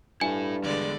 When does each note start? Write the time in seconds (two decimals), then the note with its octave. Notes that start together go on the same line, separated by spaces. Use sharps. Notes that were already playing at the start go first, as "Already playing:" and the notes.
0.21 G2 E4 A4 G#5
0.64 E2 D3 G#3 D5